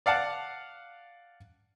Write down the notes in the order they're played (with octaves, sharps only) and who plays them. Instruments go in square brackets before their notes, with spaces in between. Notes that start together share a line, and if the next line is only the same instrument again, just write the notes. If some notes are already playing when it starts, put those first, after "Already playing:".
[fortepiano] D5 F5 F#5 A5